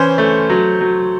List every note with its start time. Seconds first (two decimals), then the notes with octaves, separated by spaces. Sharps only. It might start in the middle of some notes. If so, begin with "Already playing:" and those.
Already playing: E3 C#4 C5
0.18 A3
0.50 F#3
0.81 F#3